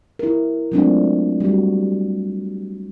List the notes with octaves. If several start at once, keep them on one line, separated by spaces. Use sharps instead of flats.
E4 A#4
F#3 G#3 A3 C4 D4 F4
G3 F#4